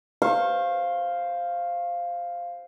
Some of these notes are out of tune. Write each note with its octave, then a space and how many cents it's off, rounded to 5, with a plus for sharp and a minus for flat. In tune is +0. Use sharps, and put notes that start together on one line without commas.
C5 +0 F5 +0 C#6 -40